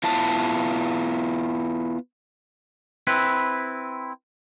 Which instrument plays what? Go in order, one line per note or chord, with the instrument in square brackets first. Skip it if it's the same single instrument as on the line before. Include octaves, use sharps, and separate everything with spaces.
[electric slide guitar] B3 E4 F4 A5
[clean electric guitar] C4 E4 B4